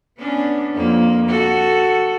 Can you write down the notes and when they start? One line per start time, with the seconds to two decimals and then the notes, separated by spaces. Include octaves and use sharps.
0.19 B3 C#4 D4
0.75 F2 A#3
1.28 F#4 A4